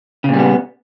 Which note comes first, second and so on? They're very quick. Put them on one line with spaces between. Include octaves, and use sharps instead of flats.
C#3 A#2 G3 B3